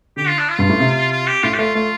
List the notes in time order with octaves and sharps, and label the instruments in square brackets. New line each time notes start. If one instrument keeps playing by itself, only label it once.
[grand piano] D3 [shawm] G4
[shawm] F4
D4
F4
[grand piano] G2
A2
C3
[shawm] F4
G4
[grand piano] A2 [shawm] F4
[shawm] G4
[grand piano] A3 [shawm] F4
[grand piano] A3 [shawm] F4